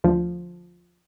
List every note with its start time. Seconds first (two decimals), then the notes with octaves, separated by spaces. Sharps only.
0.04 D2 F3